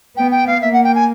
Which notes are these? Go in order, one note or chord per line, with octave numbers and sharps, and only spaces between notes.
B3 G5
G5
F5
A#3 E5
F#5
G5
G#5